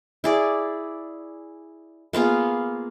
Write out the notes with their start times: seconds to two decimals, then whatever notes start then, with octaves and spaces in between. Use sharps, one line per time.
0.24 E4 G#4 D5
2.13 A#3 B3 F4 G#4